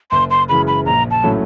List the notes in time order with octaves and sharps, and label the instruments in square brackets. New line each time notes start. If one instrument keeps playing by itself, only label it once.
[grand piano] F#1 [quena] C6
[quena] C6
[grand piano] F#2 C#3 E3 G#3 [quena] B5
[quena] B5
[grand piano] A#1 [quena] A#5
[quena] A5
[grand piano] A2 F#3 A3 C#4